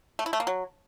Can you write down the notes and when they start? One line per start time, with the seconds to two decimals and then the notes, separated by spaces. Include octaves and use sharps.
0.19 A3
0.26 E4
0.33 A3
0.40 A#3
0.47 F#3